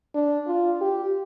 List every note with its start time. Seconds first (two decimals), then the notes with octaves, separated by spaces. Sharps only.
0.14 D4
0.47 F4
0.81 G4